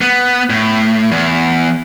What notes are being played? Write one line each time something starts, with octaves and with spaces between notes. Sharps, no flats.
B3
A2
E2